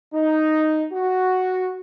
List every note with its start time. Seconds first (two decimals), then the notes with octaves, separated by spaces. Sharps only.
0.14 D#4
0.93 F#4